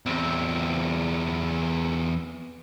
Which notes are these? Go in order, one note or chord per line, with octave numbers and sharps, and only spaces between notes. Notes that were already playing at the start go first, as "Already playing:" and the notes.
E2 C4